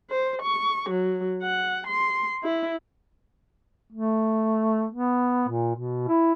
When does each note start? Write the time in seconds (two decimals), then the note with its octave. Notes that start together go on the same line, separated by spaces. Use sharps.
0.10 C5
0.42 C#6
0.90 F#3
1.43 F#5
1.87 C6
2.44 E4
3.92 A3
4.92 B3
5.49 A#2
5.75 B2
6.08 E4